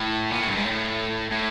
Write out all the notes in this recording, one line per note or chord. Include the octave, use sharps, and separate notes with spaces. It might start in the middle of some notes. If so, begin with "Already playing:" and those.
Already playing: A2
A#2
A2
G2
G#2
A2
A2